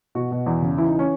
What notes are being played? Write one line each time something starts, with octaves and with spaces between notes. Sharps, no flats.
B2 F#4
B2
E2
C#3
E3 E4
D#4
E3
C#4